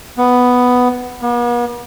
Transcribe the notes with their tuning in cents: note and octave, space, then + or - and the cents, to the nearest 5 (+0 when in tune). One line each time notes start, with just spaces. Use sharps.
B3 +5
B3 -45